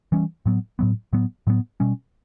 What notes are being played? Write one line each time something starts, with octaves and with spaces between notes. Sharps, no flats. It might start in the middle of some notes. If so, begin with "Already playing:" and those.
E3 G3 C#4
A2 F#3 B3
A2 F#3 B3
A2 F#3 B3
A2 F#3 B3
B2 G3 C#4